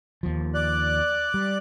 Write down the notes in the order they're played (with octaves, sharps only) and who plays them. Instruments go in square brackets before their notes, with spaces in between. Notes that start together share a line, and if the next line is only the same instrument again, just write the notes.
[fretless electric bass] D#2 F3
[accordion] D5 F#6
[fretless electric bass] G3